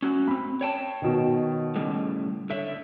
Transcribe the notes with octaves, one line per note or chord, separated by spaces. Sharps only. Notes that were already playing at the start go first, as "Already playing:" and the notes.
C#4 F#4 F#5
A#3 C4 B5
C#5 G5 A5
B2 D#3
A2 C#3 G3
D3 C#5 E5